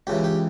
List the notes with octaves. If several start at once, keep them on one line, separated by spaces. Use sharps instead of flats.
C#2 C#3 E3 G4
G4